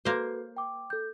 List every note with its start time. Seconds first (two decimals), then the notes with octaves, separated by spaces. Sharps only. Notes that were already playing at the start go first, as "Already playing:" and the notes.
0.05 A#3 F#4 A4 B4 C5
0.57 G5 D6
0.90 A4 G6